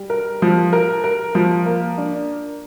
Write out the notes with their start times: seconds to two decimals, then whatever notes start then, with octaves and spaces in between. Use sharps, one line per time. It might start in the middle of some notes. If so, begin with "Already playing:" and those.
Already playing: G3
0.10 A#4
0.42 F3
0.73 A#4
1.04 A#4
1.35 F3
1.66 A#3
1.98 D4